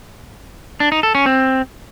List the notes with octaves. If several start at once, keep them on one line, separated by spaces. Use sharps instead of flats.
D4
D#4
A4
C#4
C4